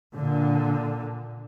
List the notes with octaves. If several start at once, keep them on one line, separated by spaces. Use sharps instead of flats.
A#2 D3